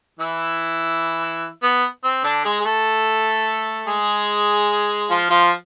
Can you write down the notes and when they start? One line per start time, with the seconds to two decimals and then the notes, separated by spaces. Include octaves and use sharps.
0.19 E3 E4
1.63 B3
2.04 C4
2.24 D3 D4
2.45 G#3 G#4
2.60 G#4
2.65 A3 A4
3.87 G#3 G#4
5.10 F3 F4
5.30 F3 F4